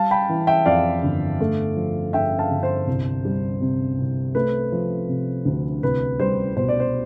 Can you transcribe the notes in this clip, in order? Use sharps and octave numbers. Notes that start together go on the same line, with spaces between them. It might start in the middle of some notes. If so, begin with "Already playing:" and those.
Already playing: G3 F5 A5
G5 B5
E3
E5 G5
F2 D5 F5
G1
A3
F3
G2 E5 G5
F5 A5
G1
C5
C2
G3
C3
C2
A3 B4
F3
C3
D2
C2 B4
G3 C5
B2 C5
D5
C5